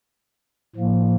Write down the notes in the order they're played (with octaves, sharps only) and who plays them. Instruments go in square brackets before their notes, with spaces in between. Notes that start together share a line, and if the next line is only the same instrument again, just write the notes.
[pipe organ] A2 F3 A#3